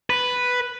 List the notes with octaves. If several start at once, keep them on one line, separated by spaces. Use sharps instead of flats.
B4